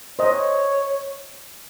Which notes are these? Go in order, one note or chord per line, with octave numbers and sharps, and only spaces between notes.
C5 C#5 D#5